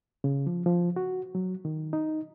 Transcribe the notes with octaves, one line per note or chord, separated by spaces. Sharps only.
C#3
F3
F3
F#4
F#3
D#3
D#4